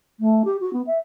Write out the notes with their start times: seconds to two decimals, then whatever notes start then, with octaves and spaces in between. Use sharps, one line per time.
0.20 A3
0.45 G4
0.61 F#4
0.73 B3
0.87 E5